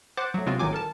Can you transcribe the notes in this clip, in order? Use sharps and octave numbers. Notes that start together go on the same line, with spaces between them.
C5 F#5 D6 F#6 A6
F#3 A3
C3 G#3 B3 C4 F4 F#4
G#1 A2 D#3 F#3 G#5 D6
A4 A#4 A5